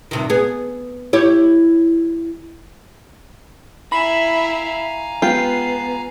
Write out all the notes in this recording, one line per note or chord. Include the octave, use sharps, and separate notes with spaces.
G2 C3 D#3
B3 G#4
E4 G4 C#5
E4 E5 F5 G#5 A#5 B5
G#3 B3 F4 G4 C7